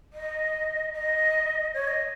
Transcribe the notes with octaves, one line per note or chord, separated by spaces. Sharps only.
D#5
D#5
C#5
D#5